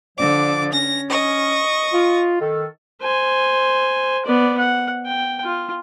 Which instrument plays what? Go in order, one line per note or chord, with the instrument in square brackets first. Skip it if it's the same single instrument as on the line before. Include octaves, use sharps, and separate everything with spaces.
[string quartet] D3 D6 [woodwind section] F3 D5
[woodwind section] C#4 [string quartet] A#6
[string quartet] D#5 C#6
[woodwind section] F4
D#3 A4
[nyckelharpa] C5 G#5
B3 D5
F#5
G5
F4